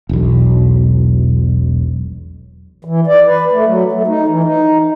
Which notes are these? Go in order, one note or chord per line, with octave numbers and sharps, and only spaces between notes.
E1 B1
E3
D5
B4
A3
F#3
A3
D#4
E3
D#4